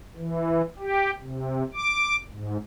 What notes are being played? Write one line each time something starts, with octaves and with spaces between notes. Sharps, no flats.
E3
G4
C3
D6
G#2